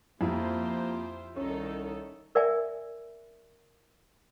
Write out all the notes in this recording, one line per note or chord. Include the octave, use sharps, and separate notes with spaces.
F2 A#3 E4 F4 G4 C5
C2 D#3 C#4 D#4 A4
A#4 D5 E5 G#5